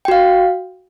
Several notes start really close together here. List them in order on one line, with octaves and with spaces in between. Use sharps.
G5 F#4 F5